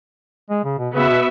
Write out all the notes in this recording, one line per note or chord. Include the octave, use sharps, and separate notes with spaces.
G#3
C#3
B2
C#3 B3 F#4 B4 E5
B2